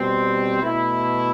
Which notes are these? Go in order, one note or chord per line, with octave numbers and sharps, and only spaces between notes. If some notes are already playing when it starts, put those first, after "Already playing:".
Already playing: B2 G3 C4
B2 A3 E4